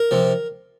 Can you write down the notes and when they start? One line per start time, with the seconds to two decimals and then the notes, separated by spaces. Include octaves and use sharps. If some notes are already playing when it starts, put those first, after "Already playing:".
Already playing: A#4
0.11 C3 F3